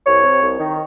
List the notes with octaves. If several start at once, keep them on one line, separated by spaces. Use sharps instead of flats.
C2 C#5
C3
C2
D#3